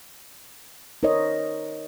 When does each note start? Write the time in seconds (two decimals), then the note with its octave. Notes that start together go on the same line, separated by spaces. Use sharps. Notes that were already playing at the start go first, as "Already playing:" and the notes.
1.03 D#4 A#4 C5 C#5 D#5